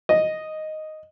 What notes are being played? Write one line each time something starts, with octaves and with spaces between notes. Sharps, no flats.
D#5